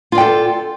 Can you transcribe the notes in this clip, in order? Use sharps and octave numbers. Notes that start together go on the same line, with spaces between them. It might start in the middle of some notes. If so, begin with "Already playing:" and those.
F4 A4 D5 G5